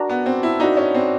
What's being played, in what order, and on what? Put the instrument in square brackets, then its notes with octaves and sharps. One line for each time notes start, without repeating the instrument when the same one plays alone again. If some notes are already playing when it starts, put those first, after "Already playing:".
Already playing: [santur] D4 F#4 A#4
[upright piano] B3
C4
E4
[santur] D4 F#4 A#4 [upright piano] D#4
[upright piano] C#4
C4